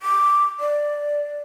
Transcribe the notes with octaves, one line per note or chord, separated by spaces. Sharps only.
D6
D5